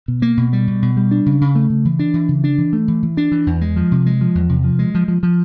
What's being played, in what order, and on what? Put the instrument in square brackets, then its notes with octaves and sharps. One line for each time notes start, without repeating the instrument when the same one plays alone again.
[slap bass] B2
A#3
B2
G3
B2
B2
G3
D4
C#3
C#3
A3
C#3
E3
D4
E3
C#3
D4
E3
A3
E3
E3
D4
E3
E2
G#3
F3
C3
G#3
F3
E2
C3
F3
G#3
F3
F3
F3